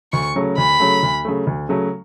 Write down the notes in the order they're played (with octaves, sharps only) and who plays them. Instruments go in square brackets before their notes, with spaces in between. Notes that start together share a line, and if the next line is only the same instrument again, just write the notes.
[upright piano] D2 [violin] C#6
[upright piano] C#3 F#3 A3
[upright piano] D2 [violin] B5
[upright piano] C#3 F#3 A3
D2
C#3 F#3 A3
D2
C#3 F#3 A3